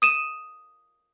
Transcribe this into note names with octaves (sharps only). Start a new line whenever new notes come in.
D#6 D#7 E7